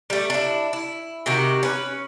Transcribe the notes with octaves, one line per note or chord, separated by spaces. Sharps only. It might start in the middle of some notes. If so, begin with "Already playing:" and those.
G3 A3
D4 E4
E4
C3 D#3 F#4 G4
C#4 B4